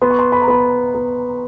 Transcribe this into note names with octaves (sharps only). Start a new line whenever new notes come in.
B3 C6
C#6
C6
B5
A#5
B3 B5
B3